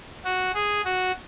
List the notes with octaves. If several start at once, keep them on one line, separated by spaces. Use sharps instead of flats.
F#4
G#4
F#4